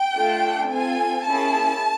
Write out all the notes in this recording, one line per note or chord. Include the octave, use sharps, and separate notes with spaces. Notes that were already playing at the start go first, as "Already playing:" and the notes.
Already playing: G5
A3 D4 F4 A4
C4 F4 A4 G#5
A#3 C#4 E4 G#4 A5